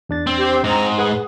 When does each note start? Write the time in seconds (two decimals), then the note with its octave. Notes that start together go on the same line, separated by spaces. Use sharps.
0.09 E2 D4 A6
0.27 C4
0.39 G4 C5
0.64 G#2 C4 A#5
0.98 G#4 B4 F#5 D#6